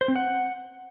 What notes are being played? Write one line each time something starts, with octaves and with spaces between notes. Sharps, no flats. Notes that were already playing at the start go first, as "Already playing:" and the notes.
C5
C4
F#5